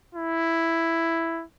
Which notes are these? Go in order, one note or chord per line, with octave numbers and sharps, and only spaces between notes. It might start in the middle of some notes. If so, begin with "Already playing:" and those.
E4